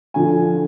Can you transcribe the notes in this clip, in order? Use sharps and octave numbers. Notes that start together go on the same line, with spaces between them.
D3 F3 G#5